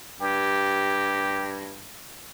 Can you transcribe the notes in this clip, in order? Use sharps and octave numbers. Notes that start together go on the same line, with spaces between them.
G2 G4